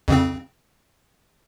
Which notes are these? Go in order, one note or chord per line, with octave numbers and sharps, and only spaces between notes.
F2 C#3 C4